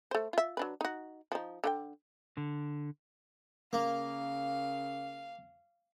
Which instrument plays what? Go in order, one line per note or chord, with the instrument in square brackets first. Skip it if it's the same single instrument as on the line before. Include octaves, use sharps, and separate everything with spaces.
[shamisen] A3 C5
F4 E5
F#3 D4 B4
D#4 F#4
F3 D#4
D3 F#4 G5
[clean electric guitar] D3
[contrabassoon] C#3 [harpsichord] A#3 [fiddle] F5